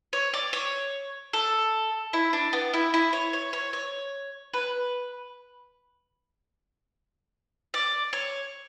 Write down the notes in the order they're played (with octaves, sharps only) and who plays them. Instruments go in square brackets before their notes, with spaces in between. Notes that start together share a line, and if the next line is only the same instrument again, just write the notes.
[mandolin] C#5
D5
C#5
A4
E4
D4
B3
E4
E4
C#5
C#5
C#5
C#5
B4
D5
C#5